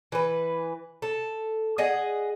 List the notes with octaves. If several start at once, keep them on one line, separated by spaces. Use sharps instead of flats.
E3 B4
A4
G#4 D#5 F#5